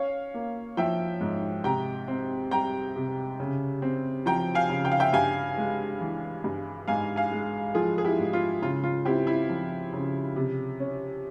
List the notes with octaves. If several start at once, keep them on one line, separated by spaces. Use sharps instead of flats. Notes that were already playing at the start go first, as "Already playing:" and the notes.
Already playing: C#4 C#5 F5
A#3
F3 E5 G5
G#2
C3 G5 A#5
C4
G3 G5 A#5
C3
C#3
C4
F3 G5 A#5
F5 G#5
C#3
G5
F5
E5 G5
G2 F5 G#5
G#3
E3
G2
G#2 F5 G#5
F5 G#5
G#3
F3 F4 G#4
G#4
E4 G4
G#2
F4
C#3 F4
F4
C4 E4 G4
E4
F3
C#3
C3
C#4